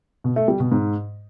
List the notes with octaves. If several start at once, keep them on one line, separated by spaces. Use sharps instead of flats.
B2
A3
G3
B2
G#2